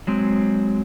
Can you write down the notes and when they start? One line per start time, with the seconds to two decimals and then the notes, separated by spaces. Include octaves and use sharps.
0.07 F#3 G#3 C4